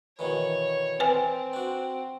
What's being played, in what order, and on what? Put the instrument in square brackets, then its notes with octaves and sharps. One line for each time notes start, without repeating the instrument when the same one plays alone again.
[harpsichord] B2 D#3 E3 [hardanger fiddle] C#5
[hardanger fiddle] C4 [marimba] B4 G#5
[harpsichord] D4 F#4